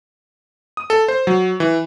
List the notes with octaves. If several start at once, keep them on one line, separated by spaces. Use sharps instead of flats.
D#6
A4
C5
F#3
E3